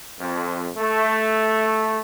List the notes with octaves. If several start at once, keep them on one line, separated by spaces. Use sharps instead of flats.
F2
A3